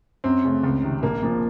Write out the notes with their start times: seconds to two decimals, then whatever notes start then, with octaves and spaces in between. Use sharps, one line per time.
0.24 F#2 C4
0.44 C#3 A3
0.63 C#2
0.84 C3 D#3
1.03 A#1 A#3
1.23 A#2 F3